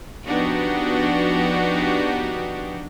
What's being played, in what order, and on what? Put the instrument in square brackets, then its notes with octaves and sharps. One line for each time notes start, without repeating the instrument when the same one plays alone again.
[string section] F3 B3 D4 D#4 F#4 G4